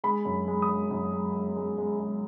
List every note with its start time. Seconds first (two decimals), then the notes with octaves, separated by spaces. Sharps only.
0.04 G#3 B5
0.25 F#2
0.48 G#3
0.62 D#6
0.69 G#3
0.91 F#2
1.13 G#3
1.34 G#3
1.57 G#3
1.78 G#3
2.00 G#3